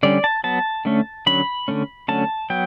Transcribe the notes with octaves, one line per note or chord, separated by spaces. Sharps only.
D3 G3 C#4 D5
A5
F#3 B3 A5
D3 A3 C#4
D3 F#3 C#4 B5
D3 A3 C#4
D3 F#3 A3 C#4 A5
F#3 B3 G5